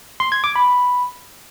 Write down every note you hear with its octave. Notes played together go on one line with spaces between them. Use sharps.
C6
G#6
D6
B5